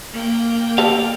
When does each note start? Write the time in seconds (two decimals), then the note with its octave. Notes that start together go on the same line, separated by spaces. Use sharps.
0.13 A#3 G5
0.78 G4 A4 F5